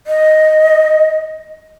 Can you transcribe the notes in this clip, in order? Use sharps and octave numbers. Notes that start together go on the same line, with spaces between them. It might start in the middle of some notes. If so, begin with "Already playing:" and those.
D#5